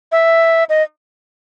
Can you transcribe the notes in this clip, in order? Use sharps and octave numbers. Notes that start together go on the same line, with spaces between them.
E5
D#5